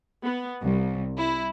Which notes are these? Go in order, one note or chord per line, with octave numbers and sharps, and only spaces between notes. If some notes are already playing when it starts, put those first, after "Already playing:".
B3
C2
E4